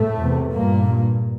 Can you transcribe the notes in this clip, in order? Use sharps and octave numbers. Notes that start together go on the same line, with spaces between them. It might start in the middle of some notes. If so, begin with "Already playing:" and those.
Already playing: A2 A3
E2 C3
G2 A#2 A#3
G2